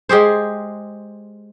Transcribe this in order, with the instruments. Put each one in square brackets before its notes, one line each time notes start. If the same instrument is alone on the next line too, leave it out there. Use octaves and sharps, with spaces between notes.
[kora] G#3 G4 G#4 C5